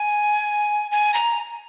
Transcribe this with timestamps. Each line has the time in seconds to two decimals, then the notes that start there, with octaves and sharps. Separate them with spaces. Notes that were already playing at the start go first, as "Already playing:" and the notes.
Already playing: G#5
0.91 G#5
1.14 A#5